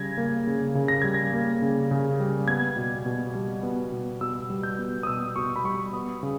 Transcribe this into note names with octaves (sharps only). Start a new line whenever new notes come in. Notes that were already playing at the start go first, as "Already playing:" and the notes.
Already playing: C#3 G3 G#6 A#6
A#3
C#3
C#3
A#6
G3 G#6
A#6
A#3
C#3
C#3
G3
B3 G#6
B2
B2
G3
B3
B2
B2 E6
G3
G6
B3
D#6
B2 E6
B2 C#6
B5
G3 C#6
B3 D#6
C#3